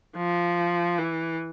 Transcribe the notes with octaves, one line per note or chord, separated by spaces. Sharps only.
F3
E3